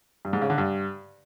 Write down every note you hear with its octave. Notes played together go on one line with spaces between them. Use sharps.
G2
G#2
C#3
D3
G2